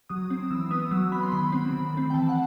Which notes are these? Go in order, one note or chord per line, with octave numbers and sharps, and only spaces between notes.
F#3 D#6
C4
E3 E6
B3 D#6
F#3 E6
B3 B5
C6
D#3 B5
F#3 C4
D#3
A3 C4
G5
E3 A5
F#5